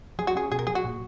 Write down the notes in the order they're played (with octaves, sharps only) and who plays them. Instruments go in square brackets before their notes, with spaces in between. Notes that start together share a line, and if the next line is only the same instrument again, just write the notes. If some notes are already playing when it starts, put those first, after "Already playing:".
[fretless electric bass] F#3 [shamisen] G#4
[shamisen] F#4
[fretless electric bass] C#4 [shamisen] G#4
[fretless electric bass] B2 [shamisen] G#4
[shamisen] A#4
[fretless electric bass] F#3 [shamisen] G#4
[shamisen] F#4
[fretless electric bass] A#2